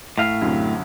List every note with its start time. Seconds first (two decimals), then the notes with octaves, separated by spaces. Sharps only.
0.18 A2 F5
0.41 C2 F#2 D3